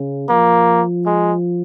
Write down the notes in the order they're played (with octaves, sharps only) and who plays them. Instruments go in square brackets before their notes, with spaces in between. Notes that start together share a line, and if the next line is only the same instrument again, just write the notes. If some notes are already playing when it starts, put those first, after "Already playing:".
Already playing: [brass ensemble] C#3
[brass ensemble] F3 [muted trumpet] A#3
[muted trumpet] G#3